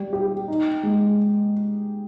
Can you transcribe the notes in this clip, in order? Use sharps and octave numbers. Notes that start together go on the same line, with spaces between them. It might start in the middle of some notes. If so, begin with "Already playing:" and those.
Already playing: G3
G4
D#4
G#3